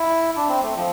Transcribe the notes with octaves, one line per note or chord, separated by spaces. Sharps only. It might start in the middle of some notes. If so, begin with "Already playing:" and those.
Already playing: E4
D4
C4
A3
F3